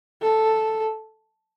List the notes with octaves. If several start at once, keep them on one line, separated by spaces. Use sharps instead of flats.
A4